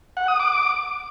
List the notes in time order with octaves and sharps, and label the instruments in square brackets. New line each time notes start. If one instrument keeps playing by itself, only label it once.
[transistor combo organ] F#5
D#6
D6